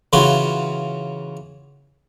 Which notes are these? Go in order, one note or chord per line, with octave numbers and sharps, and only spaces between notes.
C#3 E3 F4 F#4